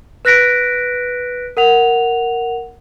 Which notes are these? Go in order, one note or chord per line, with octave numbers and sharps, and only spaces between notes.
B4 F#6 A#6 B6 D7
A#4 F#5 F7